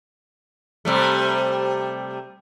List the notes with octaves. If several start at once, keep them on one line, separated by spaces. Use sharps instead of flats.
C3 G3 A3